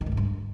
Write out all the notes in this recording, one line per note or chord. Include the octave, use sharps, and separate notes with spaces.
D#3
G#2
E2
G2